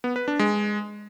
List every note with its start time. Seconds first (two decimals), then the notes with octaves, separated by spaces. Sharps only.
0.04 B3
0.16 B4
0.28 D4
0.39 G#3